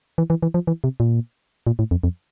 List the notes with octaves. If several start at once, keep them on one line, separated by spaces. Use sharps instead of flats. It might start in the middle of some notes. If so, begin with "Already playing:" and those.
E3
E3
E3
F3
E3
C3
A#2
A#2
A2
F2
F2